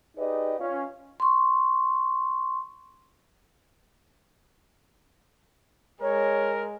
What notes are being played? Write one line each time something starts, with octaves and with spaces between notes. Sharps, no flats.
D#4 G4 G#4 B4 D5 D#5
C#4 F4 F5
C6 C#6
G#3 A#4 C#5